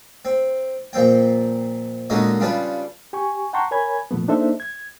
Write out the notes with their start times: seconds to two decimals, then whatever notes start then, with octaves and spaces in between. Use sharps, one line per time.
0.25 C4
0.93 A#2 F3 C4 G5
2.10 A#2 D3 G#3 C#4 D#4 F#4
2.40 C#3 G3 D4 F4 B4
3.13 G4 G#5 C#6
3.53 F#5 G5 A5 A#5 C6 C#6
3.71 A#4 C#5 G#5 B5 G#6
4.11 A#2 F3 A3 B3
4.28 A#3 D4 D#4 A4 C5 E5
4.60 G#6